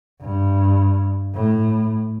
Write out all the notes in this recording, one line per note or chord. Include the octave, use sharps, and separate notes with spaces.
G2
A2